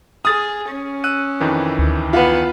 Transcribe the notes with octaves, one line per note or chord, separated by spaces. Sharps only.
G#4 D#6 F6 A6
C#4
E6 F#6 D#7
F2 D#3 E3
D2
B3 F4 B4 F#5